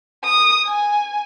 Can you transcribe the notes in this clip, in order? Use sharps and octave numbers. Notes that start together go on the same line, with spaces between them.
D#6
G#5